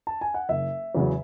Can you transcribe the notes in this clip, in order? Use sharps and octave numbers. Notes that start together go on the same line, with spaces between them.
A5
G#5
F#5
F#1 E5
E2 C#3 F#3